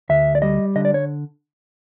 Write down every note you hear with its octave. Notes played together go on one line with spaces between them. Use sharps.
D2 E5
D5
G3 D#5
D3 D#5
D5
C#5